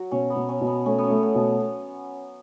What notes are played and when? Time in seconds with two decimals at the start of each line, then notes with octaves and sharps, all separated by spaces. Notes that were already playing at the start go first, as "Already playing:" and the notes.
Already playing: F#3 F#4
0.11 B2 C#4
0.30 B3
0.36 B2
0.49 C#4
0.61 B2
0.67 B3
0.86 A3 C#4
0.98 B3
1.04 C#4
1.10 A3
1.23 B3
1.35 B2